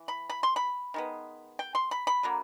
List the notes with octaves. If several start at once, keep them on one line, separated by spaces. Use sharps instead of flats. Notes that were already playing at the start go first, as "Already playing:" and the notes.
Already playing: E3
B5
B5
C6
B5
D#3 G#3 B3
G5
C6
B5
B5
D3 F#3 A#3